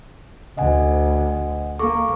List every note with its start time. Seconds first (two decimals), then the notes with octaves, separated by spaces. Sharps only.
0.57 D2 D#5 F#5 G#5
1.79 A#3 A4 C#6 D6